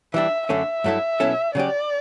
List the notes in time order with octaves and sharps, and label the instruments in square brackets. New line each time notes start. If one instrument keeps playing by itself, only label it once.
[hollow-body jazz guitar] E3 G3 D4 [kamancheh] E5
[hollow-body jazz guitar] F#2 D3 A3 C#4 [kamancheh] E5
[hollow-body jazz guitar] G2 F#3 A3 E4 A4
B2 F#3 C#4 E4 A4
[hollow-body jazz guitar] C#3 F#3 C#4 G4 [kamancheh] D5